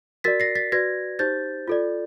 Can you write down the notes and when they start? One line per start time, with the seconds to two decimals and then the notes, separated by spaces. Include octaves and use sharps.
0.24 F#4 A#4 D5 A6 B6
0.40 A#6 C7
0.55 A6 B6
0.72 F#4 B4 D5 G#6 A#6
1.19 D#4 G4 C5 G6 A6
1.68 F4 A4 D5